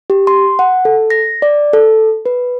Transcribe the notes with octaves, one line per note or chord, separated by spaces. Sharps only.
G4
C6
F#5
A4
A#6
D5
A4
B4